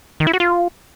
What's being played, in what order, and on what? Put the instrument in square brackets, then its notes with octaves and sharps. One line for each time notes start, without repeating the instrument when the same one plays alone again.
[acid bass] D#3
E4
F#4
F4